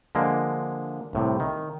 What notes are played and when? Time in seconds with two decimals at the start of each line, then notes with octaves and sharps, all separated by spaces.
0.15 D3 F3 G#3 A#3
1.13 C2 A2 C3
1.40 D#3